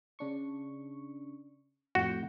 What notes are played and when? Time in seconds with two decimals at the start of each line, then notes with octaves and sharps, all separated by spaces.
0.19 C#3 D4 C#6
1.95 F2 A2 F#4 G6